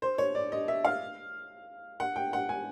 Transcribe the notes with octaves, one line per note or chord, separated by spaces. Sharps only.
C5
C#5
D5
D#5
E5
F5
F#5
G5
F#5
G#5